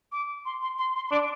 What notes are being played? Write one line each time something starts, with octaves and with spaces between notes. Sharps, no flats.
D6
C6
C6
C6
C6
C6
D4 D6